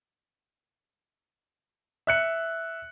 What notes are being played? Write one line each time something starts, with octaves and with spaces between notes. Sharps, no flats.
E5 F#6 C#7